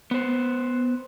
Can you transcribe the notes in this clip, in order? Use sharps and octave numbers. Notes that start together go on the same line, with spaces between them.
B3 C5